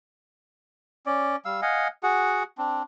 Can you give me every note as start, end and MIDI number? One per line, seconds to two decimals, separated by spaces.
1.06 1.36 61
1.06 1.36 74
1.45 1.60 55
1.45 1.60 77
1.45 1.60 88
1.62 1.88 75
1.62 1.88 77
1.62 1.88 78
1.62 1.88 80
2.03 2.43 66
2.03 2.43 68
2.03 2.43 78
2.58 2.83 60
2.58 2.83 62